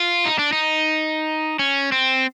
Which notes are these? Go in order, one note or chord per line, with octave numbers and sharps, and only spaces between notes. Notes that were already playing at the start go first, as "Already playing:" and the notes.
Already playing: F4
D#4
D4
D#4
C#4
C4